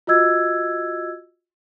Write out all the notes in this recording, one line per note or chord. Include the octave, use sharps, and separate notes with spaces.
F4 F#4 D#5 E6 G#6